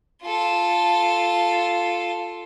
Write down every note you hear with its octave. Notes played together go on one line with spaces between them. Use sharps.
F4 A4